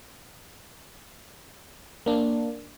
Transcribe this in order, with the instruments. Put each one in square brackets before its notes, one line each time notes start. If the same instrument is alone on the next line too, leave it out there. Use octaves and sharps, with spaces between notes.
[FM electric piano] A#3 D4